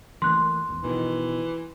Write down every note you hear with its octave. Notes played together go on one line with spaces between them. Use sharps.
E3 A3 A#3 C6 F#6
G#1 E2
B2 D#3 E3